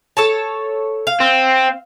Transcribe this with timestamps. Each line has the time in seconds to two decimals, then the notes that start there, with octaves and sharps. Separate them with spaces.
0.17 A4 C#5 A5
1.07 F5
1.20 C4